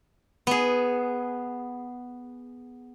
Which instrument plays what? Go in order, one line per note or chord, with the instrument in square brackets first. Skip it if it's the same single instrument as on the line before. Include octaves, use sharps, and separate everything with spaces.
[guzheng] B3 G#4